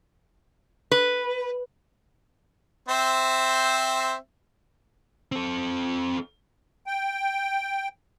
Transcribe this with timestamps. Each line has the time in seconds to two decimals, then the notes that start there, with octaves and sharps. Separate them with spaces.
0.91 B4
2.89 C4 C5 E5
5.32 C4 A4
6.86 G5